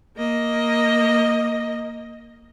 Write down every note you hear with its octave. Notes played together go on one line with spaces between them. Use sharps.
A#3 D#5